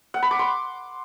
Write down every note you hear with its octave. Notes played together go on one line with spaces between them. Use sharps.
F#5
B5
D6
C6